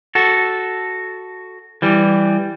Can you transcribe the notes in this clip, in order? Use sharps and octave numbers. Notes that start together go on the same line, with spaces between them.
F#4 A4
E3 G3